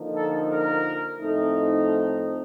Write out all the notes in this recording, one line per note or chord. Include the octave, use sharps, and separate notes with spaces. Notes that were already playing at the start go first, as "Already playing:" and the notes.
Already playing: D3 F3 A#3 D#4
A4
A#4
A2 F3 A3 C4 D#4